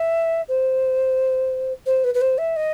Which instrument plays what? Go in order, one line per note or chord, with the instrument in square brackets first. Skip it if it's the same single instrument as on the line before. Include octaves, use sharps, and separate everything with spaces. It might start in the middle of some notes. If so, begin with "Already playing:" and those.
Already playing: [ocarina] E5
C5
C5
B4
B4
C5
E5
D#5